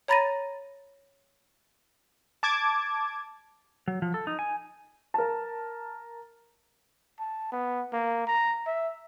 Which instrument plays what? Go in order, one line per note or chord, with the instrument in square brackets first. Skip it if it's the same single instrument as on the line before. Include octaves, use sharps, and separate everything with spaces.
[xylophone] C#5 A#5 B5 A6 A#6 D#7
[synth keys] A5 D6 G#6
[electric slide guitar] F#3
F3
A4
D#4
G#5
[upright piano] A#4 A5
[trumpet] A5
B3
A#3
A#5
E5